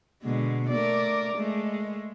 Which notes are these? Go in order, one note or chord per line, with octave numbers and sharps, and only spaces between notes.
B2 D3 G#3
A3 A#4 D5
G#3 A3